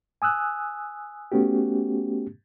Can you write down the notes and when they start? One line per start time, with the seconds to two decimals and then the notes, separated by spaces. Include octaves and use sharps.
0.22 G#5 D#6 E6 F#6
1.32 A3 B3 C#4 F#4 G4